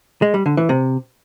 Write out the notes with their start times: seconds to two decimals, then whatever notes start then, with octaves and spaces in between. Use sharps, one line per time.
0.22 G#3
0.34 G3
0.46 D3
0.57 E3
0.69 C3